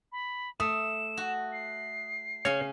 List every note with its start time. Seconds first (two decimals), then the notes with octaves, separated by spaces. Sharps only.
0.12 B5
0.60 A3 D#6 E7
1.17 F#4
1.53 C7
2.45 C#3 C#4 C#5